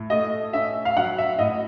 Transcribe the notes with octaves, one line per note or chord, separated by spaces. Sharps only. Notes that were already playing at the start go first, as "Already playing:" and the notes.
Already playing: A2
A3 D#5
C#4 E5
F5
F#3 F#5
E5
A2 D#5